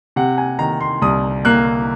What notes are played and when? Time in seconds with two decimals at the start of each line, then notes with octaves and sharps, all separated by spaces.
0.16 C3 F#5
0.38 G#5
0.59 D#3 A#5
0.80 C6
1.02 C2 D#6
1.45 A#3 F#6